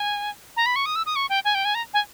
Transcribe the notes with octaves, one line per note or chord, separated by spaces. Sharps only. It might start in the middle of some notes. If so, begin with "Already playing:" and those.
Already playing: G#5
A#5
B5
C#6
D#6
E6
D#6
C#6
G5
G#5
G5
G#5
A#5
G#5